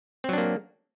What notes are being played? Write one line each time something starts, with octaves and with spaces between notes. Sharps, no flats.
F#3 A#3 C4 D4